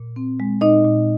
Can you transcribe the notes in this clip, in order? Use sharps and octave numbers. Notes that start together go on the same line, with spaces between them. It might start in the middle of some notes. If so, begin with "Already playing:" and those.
Already playing: A#2
C4
G#3
A#2 D#4 D#5
A#2